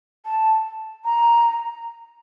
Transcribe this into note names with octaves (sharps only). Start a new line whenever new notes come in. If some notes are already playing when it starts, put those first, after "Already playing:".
A5
A#5